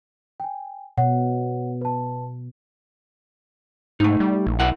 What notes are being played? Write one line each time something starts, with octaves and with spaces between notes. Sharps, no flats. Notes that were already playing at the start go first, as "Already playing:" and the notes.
G5 G#5
B2 C#5 F#5
B4 A5
G#2 A3 D#4
G3
A#1
B1 E4 A#4 F#5